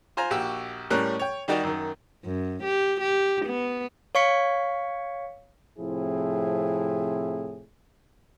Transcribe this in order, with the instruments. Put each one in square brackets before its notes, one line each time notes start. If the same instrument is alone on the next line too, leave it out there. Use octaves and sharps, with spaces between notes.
[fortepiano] F4 C5 G#5 A#5
A#1 F#4 G4 E6
A2 G3 C#4 A#4 F#6
C#5 G5
D#3 G3 D#4 F#4 G4 D5
F#2 D#3
[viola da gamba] F#2
G4
G4
B3
[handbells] C#5 F5 C#6 B6 C#7
[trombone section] A2 C3 F3 C4 E4 G#4